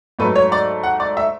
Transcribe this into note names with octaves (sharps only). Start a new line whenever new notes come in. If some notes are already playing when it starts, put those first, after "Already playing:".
G#2 F#3 A3 B4
C#5
D5
F#5
D5
E5